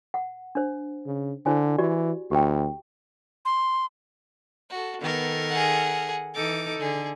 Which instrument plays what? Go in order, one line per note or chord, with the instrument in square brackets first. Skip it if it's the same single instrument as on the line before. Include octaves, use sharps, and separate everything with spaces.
[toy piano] F#5
D4 C5
[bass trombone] C#3
[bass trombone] D3 [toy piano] E4 C5 G#5
[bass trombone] E3 [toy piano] F#4 G4 D5
[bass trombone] D2 [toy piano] G4 G5
[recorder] C6
[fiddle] F#4 A4
[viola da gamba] D#3 A4 A#4 [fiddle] B3
[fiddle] G#4 F#5
[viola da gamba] E3 D#4 A4 [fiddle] D6
[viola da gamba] D3 [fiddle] G#4